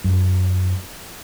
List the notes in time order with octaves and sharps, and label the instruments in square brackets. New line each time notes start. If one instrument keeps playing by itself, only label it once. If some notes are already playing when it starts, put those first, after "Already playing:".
[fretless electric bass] F#2